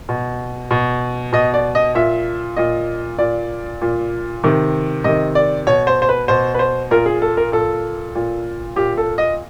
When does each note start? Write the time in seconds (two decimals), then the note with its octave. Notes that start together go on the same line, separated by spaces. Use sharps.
0.09 B2
0.71 B2
1.33 B2 D#5
1.54 D5
1.75 D#5
1.95 A#2 E5
2.57 A#2 D#5
3.18 A#2 D5
3.82 A#2
4.44 C3 D#3
5.04 C3 D#3 D#5
5.35 D5
5.67 B2 C#5
5.87 C5
6.02 C5
6.09 B4
6.28 B2 C5
6.54 B4
6.59 C5
6.91 A#2 A#4
7.06 G#4
7.22 A4
7.37 A#4
7.52 A#2 A4
8.15 A#2
8.76 A#2 G4
8.98 A4
9.18 D#5